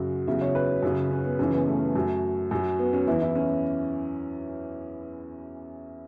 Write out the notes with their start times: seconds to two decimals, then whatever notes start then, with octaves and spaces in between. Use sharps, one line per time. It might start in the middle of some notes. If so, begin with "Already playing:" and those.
Already playing: F#2 C#3 F#3
0.27 E2 C#3 F#3 E5
0.41 C#5
0.55 B4
0.83 F#2 C#3 F#3
1.11 C#4
1.25 B3
1.39 F#2 C#3 E3 C#4
1.54 B3
1.68 A3
1.95 F#2 F#3
2.51 F#2 F#3
2.79 B3
2.93 C#4
3.07 E2 E3 E4
3.22 E4
3.35 C#4